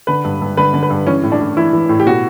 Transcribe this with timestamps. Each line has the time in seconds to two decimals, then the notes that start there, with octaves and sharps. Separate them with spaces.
0.07 D3 B4
0.24 G2
0.41 G2
0.57 D3 B4
0.74 D3
0.83 B4
0.90 G2
1.07 E3 C#4
1.23 A2
1.32 D4
1.40 A2
1.57 E3 E4
1.73 E3
1.89 A2
2.00 G4
2.06 B2 F#4